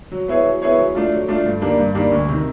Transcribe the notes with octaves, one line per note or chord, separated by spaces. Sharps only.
F#3
B3 E4 G#4 C#5
F#3
B3 E4 G#4 C#5
F#3
A3 D4 F4
F#3
A3 D4 F4
G2
D#3 G3 A#3 D4
G2
D#3 G3 A#3 D4
D2
C3 D#3